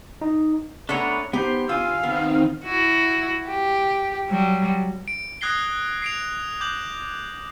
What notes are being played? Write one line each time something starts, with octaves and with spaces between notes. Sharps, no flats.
D#4
A3 B3 D4 B4 C#5 A#5
B3 D#4 G4 C5
F4 F5 G#5 E6
D#3 B3 C4 D#4
E4 F#4
G4
F#3 G3
D7
D#6 F#6 G#6 A#6 C7 G7
C7 D7 F7
D6 G6 F#7